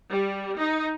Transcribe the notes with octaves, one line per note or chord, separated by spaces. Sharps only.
G3
D#4